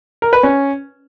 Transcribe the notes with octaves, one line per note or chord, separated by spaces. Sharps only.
A#4
B4
C#4